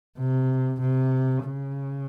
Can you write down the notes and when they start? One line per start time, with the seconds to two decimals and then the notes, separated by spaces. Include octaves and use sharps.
0.19 C3
0.81 C3
1.44 C#3